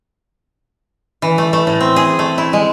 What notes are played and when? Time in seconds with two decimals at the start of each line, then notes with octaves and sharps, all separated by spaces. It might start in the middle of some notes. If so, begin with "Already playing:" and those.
1.22 E3
1.38 A3
1.53 A3
1.67 A2
1.80 C4
1.96 G#4
2.19 A3
2.38 E4
2.53 G#3